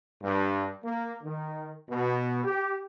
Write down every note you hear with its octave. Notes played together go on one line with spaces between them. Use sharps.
G2
A#3
D#3
B2
G4